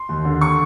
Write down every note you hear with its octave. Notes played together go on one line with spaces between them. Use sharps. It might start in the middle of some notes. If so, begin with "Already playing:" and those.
Already playing: C6
D#2
D3
C#6